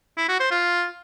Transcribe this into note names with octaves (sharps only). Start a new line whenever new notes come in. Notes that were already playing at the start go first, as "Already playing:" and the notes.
E4
F#4
C5
F4